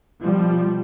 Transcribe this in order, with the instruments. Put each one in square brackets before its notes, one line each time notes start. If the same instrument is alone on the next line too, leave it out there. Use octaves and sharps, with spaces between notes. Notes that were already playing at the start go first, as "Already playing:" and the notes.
[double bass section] B2 F3 G3